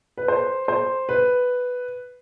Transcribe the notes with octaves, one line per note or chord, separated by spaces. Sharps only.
B4
C5
C5
B4